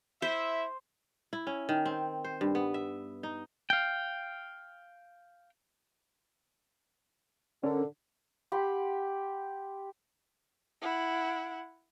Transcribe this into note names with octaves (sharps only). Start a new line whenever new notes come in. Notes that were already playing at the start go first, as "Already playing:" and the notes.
E4 C5 E5
E4
C#4
D#3
C4
C5
G2
B3
E5
D#4
F5 G5
D3 C#4 A#4
G4 F#5 B5 C6
E4 F#5